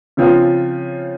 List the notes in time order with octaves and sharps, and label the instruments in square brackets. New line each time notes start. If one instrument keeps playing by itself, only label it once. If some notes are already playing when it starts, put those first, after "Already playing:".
[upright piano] C#3 F3 C4 F4